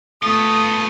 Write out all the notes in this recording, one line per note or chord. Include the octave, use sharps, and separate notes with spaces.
A3 B3 F4 D#6